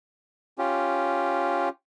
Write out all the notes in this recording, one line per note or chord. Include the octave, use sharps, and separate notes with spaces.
C#4 F4 G4